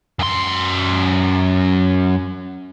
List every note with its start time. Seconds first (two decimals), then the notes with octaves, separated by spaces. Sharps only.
0.19 F#2 C6